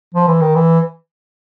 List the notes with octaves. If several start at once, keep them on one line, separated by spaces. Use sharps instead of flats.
F3
E3
D#3
E3